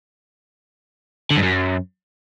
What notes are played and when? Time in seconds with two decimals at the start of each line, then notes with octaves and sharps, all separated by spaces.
1.31 D3
1.37 G2
1.43 F#2